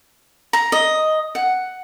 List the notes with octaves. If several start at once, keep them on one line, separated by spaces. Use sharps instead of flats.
A#5
D#5
F#5